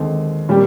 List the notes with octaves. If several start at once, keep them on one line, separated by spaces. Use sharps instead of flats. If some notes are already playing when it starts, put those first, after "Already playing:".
Already playing: D#2 D3 G#3 C4
A#2 G3 C4 G4